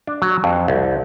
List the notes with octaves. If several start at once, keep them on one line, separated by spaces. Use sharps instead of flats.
D4
F#3
F2
C2